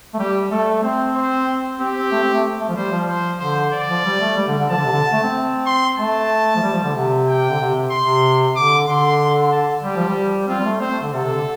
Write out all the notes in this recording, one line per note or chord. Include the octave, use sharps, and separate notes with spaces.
A3
G3 G4
A3 A4
C4 C5
C5
C4 G4
C4
A3
C4
A3
A3
F3
G3 C5
F3
C5
D3 C5
D5
F3
G3
A3
G3
D3
D3
F3 A5
D3
C3
D3
A3
C4
C6
A3 A5
F3
G3
F3
D3
C3
G5
D3
C3
C3
C6
C3
D3 D6
D3 C6
A5
G3 G4
F3
G3
C4 F4
G3
A3
C4 C5
A3
D3
C3 A4
C3
D3